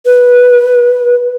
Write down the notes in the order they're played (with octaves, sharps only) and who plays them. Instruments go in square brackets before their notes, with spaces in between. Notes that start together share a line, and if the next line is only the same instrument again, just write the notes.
[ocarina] B4